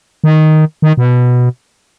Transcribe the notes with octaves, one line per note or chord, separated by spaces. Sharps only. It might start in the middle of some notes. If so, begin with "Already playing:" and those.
D#3
D#3
B2